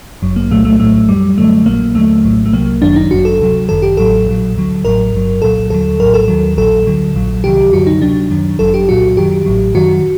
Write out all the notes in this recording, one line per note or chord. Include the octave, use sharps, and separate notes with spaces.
G1 F#2 F#3
A#3
C2 A#2 F#3 A3
A3
A#1 A2 F#3 A3
F#2 F#3 G3
F#2 D3 F#3 A3
A#1 A#2 F#3 A#3
D#2 D3 F#3 A3
A#1 A2 F#3
A3
C2 C3 F#3 A#3
G1 F#2 D#3 F#3 D4
D#4
G1 F#2 F#3 F#4
A4
D2 C3 F#3
G1 F#2 D#3 A4
G4
A1 A2 F#3 A4
A#1 A#2 F#3
D2 D3 F#3
A1 A2 F#3 A#4
G1 G2 F#3
C2 A#2 F#3 A4
D#2 D3 F#3 A4
A#1 A2 F#3 A#4
A4
D#2 D#3 F#3
A#1 A#2 F#3 A4
D2 D3 F#3
A#1 A#2 F#3
C2 C3 D#3 F#3 G4
F#2 D3 F#3 F#4
D#4
D2 C3 F#3 D4
F#2 D#3 F#3
G1 F#2 F#3 A4
G4
C2 A#2 F#3 F#4
F#2 D#3 F#3 G4
A1 A2 F#3
F#2 D#3 F#3 F#4